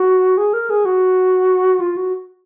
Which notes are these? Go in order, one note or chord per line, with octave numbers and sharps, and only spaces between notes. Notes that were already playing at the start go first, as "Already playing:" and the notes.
Already playing: F#4
G#4
A#4
G#4
F#4
F4
F#4